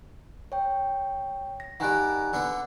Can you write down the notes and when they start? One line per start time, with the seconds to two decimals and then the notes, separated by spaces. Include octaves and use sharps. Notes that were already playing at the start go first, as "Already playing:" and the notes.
0.52 C#5 G5
1.60 A#6
1.80 D#3 G3 F#5 G#5 F#6
2.33 D3 B3